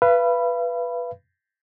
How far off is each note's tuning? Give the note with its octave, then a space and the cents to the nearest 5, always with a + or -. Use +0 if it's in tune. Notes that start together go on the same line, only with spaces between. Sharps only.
B4 -5 F5 -45 B5 +0